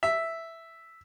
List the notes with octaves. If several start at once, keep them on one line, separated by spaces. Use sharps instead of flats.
E5